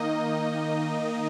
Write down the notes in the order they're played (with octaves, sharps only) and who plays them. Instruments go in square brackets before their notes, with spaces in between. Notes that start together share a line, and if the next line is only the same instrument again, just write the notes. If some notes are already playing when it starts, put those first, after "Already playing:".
Already playing: [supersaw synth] D#3 A#3 D#4 D#5